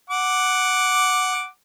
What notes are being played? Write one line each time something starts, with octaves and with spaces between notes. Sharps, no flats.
F#5 D6